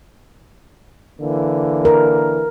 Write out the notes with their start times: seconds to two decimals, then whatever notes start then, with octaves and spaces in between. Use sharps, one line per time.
1.19 D3 E3 A#3
1.85 A#4